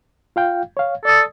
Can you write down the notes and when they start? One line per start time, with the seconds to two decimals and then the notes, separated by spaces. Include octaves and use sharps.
0.36 F4 F5 G5
0.77 C#5 F5
1.05 A4 D5 D#6